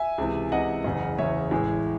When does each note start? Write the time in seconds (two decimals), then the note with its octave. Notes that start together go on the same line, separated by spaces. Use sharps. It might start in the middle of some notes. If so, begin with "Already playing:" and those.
Already playing: E5 G#5
0.18 C#2 C3 E3
0.52 C#2 C3 E3 D#5 F#5
0.84 F#1 E2 C#3
1.18 F#1 E2 C#3 C#5 E5
1.51 A1 A2 E3 G#3